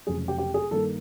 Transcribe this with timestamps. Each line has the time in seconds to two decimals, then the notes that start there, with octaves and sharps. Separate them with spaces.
0.07 F1 F2 C#3 F#3 G#4
0.28 G4
0.38 G4
0.54 G#4
0.71 G2 D#3 G3 A#3 A4